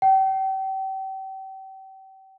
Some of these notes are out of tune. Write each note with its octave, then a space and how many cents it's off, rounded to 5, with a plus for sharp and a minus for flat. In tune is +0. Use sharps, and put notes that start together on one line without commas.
G5 -35